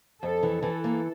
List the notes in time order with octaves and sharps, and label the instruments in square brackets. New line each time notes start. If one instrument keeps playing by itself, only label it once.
[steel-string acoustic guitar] F2 [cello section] A4
[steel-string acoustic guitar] E3
[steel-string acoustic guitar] E3 [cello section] A4
[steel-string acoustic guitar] A#3